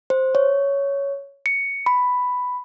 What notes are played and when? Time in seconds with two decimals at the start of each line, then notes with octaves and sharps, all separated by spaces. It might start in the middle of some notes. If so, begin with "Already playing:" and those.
0.10 C5
0.35 C#5
1.46 C#7
1.86 B5